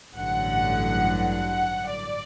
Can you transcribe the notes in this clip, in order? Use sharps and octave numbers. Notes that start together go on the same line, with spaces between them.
A1 G2 D3 F#3 F#5
F#5
D5